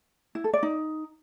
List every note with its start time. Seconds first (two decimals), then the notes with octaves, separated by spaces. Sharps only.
0.35 E4
0.44 A4
0.53 D5
0.63 D#4